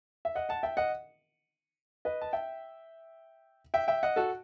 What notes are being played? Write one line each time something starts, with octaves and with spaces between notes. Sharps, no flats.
E5
D#5 F#5
F#5 A5
E5 G5
D#5 F#5
B4 D#5
A5
E5 G5
E5 G5
E5 G5
D#5 F#5
F#4 A4